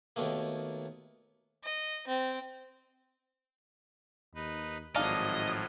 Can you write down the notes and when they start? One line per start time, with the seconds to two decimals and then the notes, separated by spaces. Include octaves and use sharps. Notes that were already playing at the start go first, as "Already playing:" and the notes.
0.16 D#2 B2 D#3 A3 A#3
1.64 D#5
2.07 C4
4.35 D#2 D#4 B4
4.96 G#1 A2 F3 F#3 D4 D#4 D#5 F5